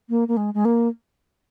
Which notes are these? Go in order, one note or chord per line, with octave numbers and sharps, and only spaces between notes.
A#3
A#3
G#3
G#3
A#3